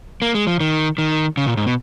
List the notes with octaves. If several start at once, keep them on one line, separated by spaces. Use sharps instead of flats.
A#3
G#3
F3
D#3
D#3
C#3
A#2
G#2
B2